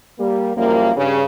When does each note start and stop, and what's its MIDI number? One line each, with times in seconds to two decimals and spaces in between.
0.18 0.51 55
0.18 0.51 58
0.56 0.91 42
0.56 0.91 53
0.56 0.91 55
0.56 0.91 58
0.96 1.23 43
0.96 1.23 49